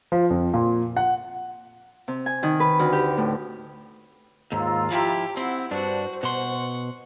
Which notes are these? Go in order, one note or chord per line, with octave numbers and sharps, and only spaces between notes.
F3
F2
A#2
F#5
C3
G#5
D#3
B4
D2
G4
A2
D#2 G#2 F4 A#5 E6
F3 E4 G4
C4 E4 F#5
G2 D4 F#4 C5
B2 F#5 C6 C#6